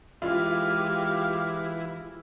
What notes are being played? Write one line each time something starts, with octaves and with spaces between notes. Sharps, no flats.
E3 G#3 E4 F4 G4 F5